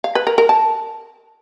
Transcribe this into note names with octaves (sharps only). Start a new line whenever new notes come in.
F5
B4
A#4
A#4
A5